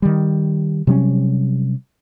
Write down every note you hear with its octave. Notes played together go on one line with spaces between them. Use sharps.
D#3 G3
C3 F#3 G3 C#4